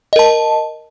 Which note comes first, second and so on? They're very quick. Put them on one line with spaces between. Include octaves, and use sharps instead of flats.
D#5 A#4 A5